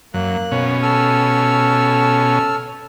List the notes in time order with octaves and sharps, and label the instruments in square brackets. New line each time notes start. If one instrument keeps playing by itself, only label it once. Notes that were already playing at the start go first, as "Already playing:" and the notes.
[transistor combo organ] F#2 [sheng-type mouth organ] A#3 F#6
[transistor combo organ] B2 C#4
[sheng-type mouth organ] A4 E6 F6